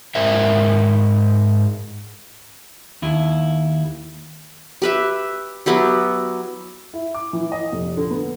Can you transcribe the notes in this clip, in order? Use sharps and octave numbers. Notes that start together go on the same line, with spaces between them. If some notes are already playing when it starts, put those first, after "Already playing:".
G#2 A#4 C5 E5
D#2 E4
G4 B4 E5
F#3 B3 E4 G4
E4
D6
E3
D#5
F1
D3
B3